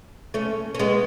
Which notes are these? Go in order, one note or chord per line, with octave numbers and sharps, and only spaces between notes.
A3 C#4
C#4
G#3 B3